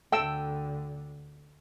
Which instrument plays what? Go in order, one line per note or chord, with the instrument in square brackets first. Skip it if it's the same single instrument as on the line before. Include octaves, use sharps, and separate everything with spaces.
[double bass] D2 D3 [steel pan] A4 E6 [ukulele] G5